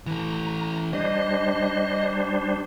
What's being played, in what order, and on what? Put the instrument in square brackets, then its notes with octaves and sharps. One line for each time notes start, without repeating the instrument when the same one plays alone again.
[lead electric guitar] E3 A4 [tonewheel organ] A#5
[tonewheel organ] G3 D4 C5 [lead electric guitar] D#5